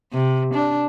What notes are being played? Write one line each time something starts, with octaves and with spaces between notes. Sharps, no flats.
C3
D4